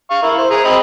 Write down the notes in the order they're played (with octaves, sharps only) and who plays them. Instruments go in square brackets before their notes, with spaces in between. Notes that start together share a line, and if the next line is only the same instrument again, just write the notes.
[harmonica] F5 C#6
E4 A#4
C5
G#4 A#5
C4 D#5 B5